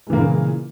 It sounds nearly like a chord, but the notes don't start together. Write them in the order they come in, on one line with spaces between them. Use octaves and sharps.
G#3 E3 A#3 A#2 C#3